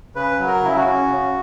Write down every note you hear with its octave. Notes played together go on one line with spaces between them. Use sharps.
C#3 B4
F#3
A#4
C#3 E4
F#4
C#4
C#3